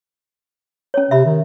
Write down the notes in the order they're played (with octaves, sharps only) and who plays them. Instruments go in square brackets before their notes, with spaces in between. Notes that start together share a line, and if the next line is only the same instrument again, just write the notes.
[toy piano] C#4 C#5
[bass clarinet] C3 [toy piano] E5 B5
[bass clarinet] D#3